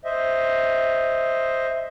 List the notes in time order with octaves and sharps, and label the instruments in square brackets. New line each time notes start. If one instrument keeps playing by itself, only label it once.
[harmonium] C5 D#5 E5